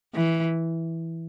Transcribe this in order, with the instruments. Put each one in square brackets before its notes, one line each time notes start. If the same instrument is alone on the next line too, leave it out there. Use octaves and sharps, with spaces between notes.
[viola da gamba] E3